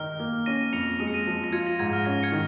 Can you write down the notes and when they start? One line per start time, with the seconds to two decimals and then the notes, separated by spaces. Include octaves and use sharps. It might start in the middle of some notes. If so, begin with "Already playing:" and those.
Already playing: D#3 D#4 F6
0.19 A#3
0.46 C#4 A#6 D#7
0.72 F2 C#7 F7
1.00 G#3 D#7
1.07 C#7
1.14 A#6 D#7
1.27 F3
1.44 A#6
1.52 F4 G#6 C#7
1.66 A#6
1.79 G#2 G#6
1.93 F6
2.06 C#4 A#6
2.23 G#6 C#7
2.32 D#3